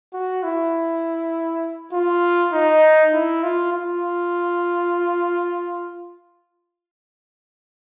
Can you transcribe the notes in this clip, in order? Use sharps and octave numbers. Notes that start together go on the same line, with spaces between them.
F#4
E4
F4
D#4
E4
F4
F4